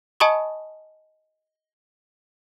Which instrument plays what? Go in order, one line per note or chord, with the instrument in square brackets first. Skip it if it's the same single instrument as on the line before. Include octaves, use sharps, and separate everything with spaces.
[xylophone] D#5 G#5 A5 B5 C#6 D#6